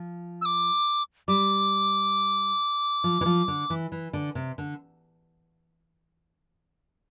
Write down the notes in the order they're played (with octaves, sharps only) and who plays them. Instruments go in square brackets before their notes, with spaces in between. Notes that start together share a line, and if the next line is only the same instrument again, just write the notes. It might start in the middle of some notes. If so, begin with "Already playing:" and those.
Already playing: [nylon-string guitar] F3
[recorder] E6
D6
[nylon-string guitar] G3 [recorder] D6
[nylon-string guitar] F3
E3
F3
D3
E3
E3
D3
C3
D3